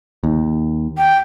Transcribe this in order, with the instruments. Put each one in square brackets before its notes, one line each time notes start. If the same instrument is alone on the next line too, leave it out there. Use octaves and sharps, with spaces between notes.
[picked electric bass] D#2
[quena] G5